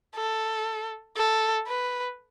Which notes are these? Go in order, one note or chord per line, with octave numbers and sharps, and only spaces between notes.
A4
A4
B4